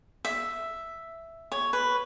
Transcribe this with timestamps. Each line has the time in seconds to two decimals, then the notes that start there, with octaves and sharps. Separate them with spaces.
0.25 E5
1.52 C#5
1.73 B4